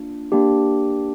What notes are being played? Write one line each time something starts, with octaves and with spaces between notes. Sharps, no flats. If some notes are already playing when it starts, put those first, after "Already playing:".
Already playing: A#3 D4 F4
A#3 D4 G4